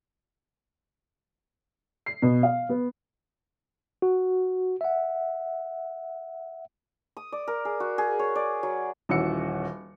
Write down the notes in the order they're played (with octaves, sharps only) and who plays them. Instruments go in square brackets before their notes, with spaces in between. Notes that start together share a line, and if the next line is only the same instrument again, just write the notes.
[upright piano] C7
B2
F5
B3
[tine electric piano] F#4
E5 F#5
[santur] D#6
D5
A#4
G#4
F#4
G#4
C#5
D5
F#3
[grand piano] D#1 E3 C#4 F#4 E6 C#7